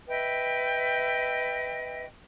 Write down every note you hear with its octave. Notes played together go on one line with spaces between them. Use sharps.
B4 D#5 E5 G5